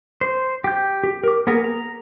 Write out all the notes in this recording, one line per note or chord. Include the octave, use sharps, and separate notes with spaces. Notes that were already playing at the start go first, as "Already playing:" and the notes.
C5
G4 G6
G4
A#4 D6
A#3 B3 G#4 A#4
A#5